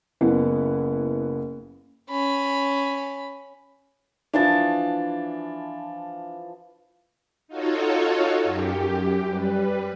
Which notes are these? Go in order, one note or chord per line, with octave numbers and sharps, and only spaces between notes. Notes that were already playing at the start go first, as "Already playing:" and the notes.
F#1 B3 E4
C#4 B5
E3 F3 D4 A5
D#4 F4 F#4 A4 C#5
F#2 G4
G3 B4